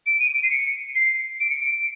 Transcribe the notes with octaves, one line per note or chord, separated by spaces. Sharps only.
D7
D#7
D7
C7
C#7
C7
D7
C#7
D7